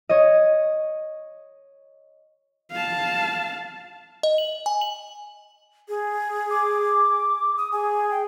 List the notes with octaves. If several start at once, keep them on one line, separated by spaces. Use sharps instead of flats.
C#5 D#5
F5 A5
D#5
F#7
G#5
F#7
G#4
D6
D#6
G#4 G#5
G5